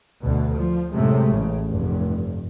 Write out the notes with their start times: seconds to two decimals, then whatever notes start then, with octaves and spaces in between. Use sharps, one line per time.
0.24 D2 B2
0.57 F3
0.94 F#2 A2 C3 G#3 A3
1.30 A1 C#3
1.66 F1 G2